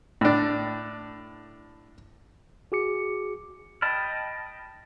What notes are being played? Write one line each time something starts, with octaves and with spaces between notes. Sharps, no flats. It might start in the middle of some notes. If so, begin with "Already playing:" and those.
A2 D4
F#4 G#4 D6 C#7
D#5 G5 A5 B5 F6